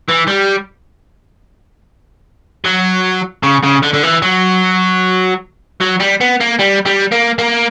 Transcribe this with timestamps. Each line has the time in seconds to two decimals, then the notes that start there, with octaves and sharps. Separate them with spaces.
0.09 E3
0.28 G3
2.64 F#3
3.43 C#3
3.63 C#3
3.83 D3
3.93 D3
4.03 E3
4.23 F#3
5.81 F#3
6.00 G3
6.21 B3
6.40 A#3
6.59 G3
6.86 G3
7.12 A#3
7.38 A#3